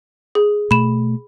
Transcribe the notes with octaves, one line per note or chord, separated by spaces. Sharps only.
G#4
B2 A3 B5 E7